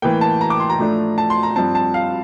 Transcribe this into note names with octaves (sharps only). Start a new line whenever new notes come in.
A2 E3 A#3 G5
A5
A#5
D6
C6
A#5
A2 F3 A3 D4
A5
C6
A#5
G2 F3 C4 A5
A5
F5